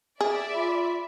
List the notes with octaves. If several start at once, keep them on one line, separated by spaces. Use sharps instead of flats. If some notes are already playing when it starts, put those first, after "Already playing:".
G#4 D5 E5
F4 B5